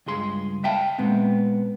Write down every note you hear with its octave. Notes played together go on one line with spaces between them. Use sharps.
C#2 G2 G#4 C6
E5 F5 G5 A5
A#2 G#3 B3 C4